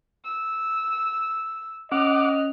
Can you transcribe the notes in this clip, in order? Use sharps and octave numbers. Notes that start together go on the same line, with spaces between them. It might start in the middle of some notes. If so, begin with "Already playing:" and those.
E6
C#4 D#5 F#5 D6 F6 F#6